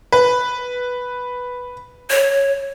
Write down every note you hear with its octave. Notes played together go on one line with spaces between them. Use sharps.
B4
C#5